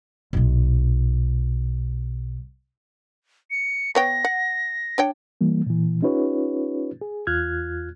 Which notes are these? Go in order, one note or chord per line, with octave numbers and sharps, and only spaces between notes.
B1 A#2
C#7
B3 C#5 G5 A#6
F#5
D4 C#5 G5
E3 G3 A#3
A#2 E3
C#4 D#4 F4 G4 B4 C#5
G#4
E2 F4 F6 F#6 G#6